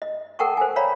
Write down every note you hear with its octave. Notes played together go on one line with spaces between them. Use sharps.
D#5
A4 A#4 F#5 G5 A5 C#6
C5 G#5
C#5 D5 F5 A#5 B5